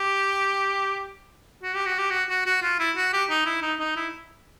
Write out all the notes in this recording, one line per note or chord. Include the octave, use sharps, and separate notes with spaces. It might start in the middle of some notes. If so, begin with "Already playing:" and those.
Already playing: G4
F#4
G4
F#4
G4
F#4
F#4
F#4
F4
E4
F#4
G4
D#4
E4
D#4
D#4
E4